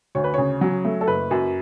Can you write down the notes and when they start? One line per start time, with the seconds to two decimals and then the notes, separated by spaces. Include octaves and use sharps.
0.15 D2 C#5
0.24 B4
0.34 C#3 C#5
0.61 F#3
0.85 A3
1.01 A4
1.07 F#1 B4
1.31 F#2